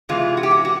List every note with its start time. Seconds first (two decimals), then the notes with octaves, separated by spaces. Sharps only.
0.09 E2 C3 E3 G#3 F4
0.37 F#4
0.43 G4
0.51 F#4
0.65 F#4